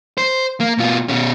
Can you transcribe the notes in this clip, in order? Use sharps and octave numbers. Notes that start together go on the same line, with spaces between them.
C5
A#3
B2 F4
B2 C#4